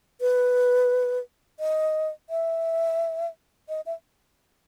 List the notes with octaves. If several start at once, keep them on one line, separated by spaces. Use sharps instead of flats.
B4
D#5
E5
D#5
E5